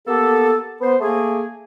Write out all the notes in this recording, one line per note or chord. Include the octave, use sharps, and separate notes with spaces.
A#3 B3 G4 A4
B3 C5
A3 A#3 G#4